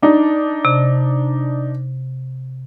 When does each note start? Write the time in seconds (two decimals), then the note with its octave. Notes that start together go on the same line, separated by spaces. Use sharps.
0.02 D4 D#4
0.65 C3